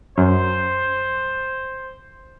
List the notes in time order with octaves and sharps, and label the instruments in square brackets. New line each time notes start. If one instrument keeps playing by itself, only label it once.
[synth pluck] F#2 [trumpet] C5